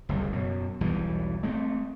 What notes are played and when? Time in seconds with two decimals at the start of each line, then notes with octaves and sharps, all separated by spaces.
0.09 F#1 C#2 A#2 G3
0.33 F#2 B2
0.81 B1 E2 E3 G3
1.43 G#3 A3 C4